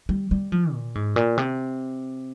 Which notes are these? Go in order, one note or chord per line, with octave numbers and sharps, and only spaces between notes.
G3
G3
F3
A#2
G#2
A#2
C3